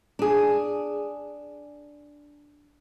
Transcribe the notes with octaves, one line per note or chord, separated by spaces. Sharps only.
D4 G#4